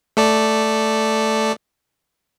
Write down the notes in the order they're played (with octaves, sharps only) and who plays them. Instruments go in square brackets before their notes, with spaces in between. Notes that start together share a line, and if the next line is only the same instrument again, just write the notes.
[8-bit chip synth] A3 A4 D5